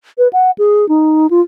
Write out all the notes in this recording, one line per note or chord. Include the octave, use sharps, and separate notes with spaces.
B4
F#5
G#4
D#4
F4